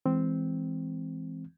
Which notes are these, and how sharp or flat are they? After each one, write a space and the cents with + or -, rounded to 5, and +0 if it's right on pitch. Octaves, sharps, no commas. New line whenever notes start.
E3 +0 G#3 +0 C4 -5